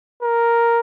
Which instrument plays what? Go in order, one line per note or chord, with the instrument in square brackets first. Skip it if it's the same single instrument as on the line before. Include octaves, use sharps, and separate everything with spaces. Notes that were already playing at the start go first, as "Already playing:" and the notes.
[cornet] A#4